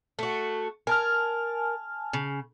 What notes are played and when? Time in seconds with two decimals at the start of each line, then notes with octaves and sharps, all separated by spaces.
0.19 A3 F#4
0.87 A#4 G#5 A5 F6
2.13 C#3